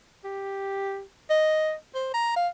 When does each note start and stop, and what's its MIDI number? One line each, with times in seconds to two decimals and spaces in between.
0.24 1.02 67
1.30 1.73 75
1.95 2.11 72
2.14 2.35 82
2.36 2.48 77